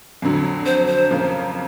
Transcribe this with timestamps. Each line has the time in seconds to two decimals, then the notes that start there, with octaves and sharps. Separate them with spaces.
0.22 F2 D3 F#3
0.66 C5
0.88 C5
1.11 F2 C#3 F3 A#3